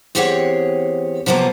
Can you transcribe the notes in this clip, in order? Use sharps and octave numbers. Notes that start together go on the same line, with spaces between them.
E2 C4 G4 G#4 C#5 F#5
C3 F3 F#3 A#3 B3 F4